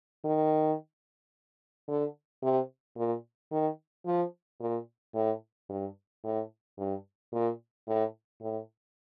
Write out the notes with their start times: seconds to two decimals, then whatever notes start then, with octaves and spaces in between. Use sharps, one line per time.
0.24 D#3
1.88 D3
2.43 C3
2.97 A#2
3.52 D#3
4.06 F3
4.61 A#2
5.15 A2
5.69 G2
6.24 A2
6.78 G2
7.33 A#2
7.87 A2
8.42 A2